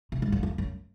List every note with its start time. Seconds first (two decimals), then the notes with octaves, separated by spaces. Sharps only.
0.12 B2
0.22 G#2
0.32 F#2
0.43 E2
0.58 F#2